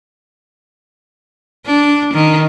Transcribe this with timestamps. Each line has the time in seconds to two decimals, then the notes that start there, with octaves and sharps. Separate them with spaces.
1.66 D4
2.14 D#3